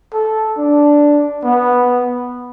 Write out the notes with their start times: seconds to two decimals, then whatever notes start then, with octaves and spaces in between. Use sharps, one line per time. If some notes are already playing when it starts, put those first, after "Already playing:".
0.14 A4
0.58 D4
1.44 B3